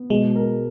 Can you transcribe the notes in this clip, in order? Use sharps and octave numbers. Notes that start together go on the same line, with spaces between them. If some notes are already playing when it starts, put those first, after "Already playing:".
Already playing: B3
B2 G#3
A#4